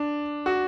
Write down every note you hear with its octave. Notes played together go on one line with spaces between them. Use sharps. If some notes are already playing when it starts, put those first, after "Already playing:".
Already playing: D4
F#4